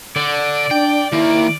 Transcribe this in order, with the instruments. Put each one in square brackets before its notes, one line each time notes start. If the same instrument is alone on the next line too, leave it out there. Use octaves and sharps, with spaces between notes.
[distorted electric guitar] D3 [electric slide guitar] D5
[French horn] D4 [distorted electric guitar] G5
[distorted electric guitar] D#3 A#3 [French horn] E4